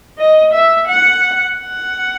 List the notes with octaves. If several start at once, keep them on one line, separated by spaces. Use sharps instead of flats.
D#5
E5
F#5
F#5